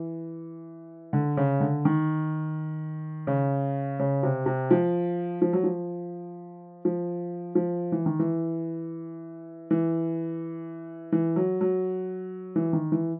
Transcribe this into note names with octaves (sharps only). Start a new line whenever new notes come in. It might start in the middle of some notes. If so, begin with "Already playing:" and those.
Already playing: E3
D3
C#3
D3
D#3
C#3
C#3
C3
C3
F3
F3
F#3
F3
F3
F3
E3
D#3
E3
E3
E3
F#3
F#3
E3
D#3
E3